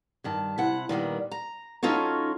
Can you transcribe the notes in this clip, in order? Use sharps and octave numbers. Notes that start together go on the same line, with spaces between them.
G2 D#3 A5
C3 E4 F#5
A#2 D#3 G3 B3
A#5
F#3 C#4 D#4 F4 A4 C#5